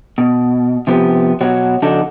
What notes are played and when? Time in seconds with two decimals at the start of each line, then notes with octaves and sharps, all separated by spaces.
0.18 B2
0.87 C3 F3 B3 G4
1.41 B2 F#3 F#4 C#5 F#5
1.82 F2 C#3 D4 D#4 F#4 A4